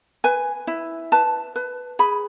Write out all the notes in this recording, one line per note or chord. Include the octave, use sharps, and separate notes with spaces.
B4 G#5
E4
B4 A5
B4
G#4 B5